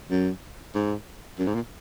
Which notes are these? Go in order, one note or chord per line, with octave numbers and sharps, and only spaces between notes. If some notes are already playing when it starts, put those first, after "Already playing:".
F#2
G#2
F#2
G#2
A#2